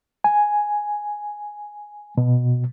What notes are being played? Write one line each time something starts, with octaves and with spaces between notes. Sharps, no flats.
G#5
B2